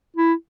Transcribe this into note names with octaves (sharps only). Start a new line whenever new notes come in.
E4